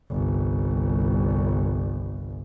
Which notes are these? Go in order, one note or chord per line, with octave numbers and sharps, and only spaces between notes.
G1 C2